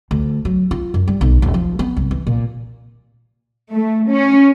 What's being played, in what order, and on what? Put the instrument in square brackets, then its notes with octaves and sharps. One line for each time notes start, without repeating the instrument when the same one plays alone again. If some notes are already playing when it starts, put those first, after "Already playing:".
[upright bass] D2
F#3
F4
F#2
G3
B1
D#1
F3
B3
C2
E3
A#2
[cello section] A3
C#4